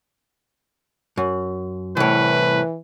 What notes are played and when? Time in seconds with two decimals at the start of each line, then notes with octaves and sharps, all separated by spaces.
1.17 F#2
1.97 C2 A2 E3 B4